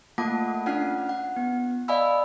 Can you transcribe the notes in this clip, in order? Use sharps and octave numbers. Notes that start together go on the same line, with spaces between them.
A3 A#3 F4 F#5 A5 D6
C#4 D4 F4 F#5 F6 C7
F#5
B3
D5 D#5 F5 G#5 B5 E6